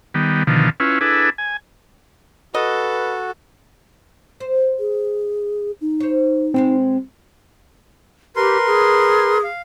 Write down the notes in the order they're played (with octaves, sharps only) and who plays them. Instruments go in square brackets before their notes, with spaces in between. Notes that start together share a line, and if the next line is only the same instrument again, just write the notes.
[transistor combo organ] D#3 G3 B3
B2 D3 D#3 F3
C#4 E4 F4 B4
D4 E4 G#4 A4 B4
G#5
[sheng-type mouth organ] F#4 [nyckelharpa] A4 [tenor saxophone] B4 [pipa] D#5
[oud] C5
[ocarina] G#4
D#4
[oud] C5 C#5
[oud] B2 G#3 C5 [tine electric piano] C4
[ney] G4 [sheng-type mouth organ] A#4 B4 C6
[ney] G#4
[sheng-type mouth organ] F5